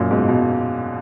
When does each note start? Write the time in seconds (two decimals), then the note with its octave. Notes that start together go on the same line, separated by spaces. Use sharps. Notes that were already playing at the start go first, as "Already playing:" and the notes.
Already playing: F#2 A#2
0.10 G#2 B2
0.28 B2